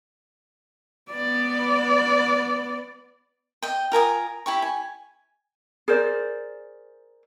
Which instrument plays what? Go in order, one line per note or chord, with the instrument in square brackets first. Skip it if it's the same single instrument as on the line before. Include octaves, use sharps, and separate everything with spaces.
[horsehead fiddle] B3 D5
[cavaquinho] D#5 G5
F4 A#4 G#5 D#6
E4 G4 C#6
G#5
[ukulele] G#4 A#4 C5 D5